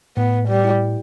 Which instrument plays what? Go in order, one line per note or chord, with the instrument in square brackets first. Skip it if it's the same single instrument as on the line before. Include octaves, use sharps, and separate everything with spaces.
[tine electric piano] A2 [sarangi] B3
[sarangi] G3
[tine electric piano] E4